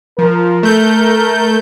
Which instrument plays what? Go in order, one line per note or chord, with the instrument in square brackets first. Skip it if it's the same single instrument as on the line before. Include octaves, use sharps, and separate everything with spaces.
[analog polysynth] F3 [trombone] A#4
[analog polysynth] A3 G6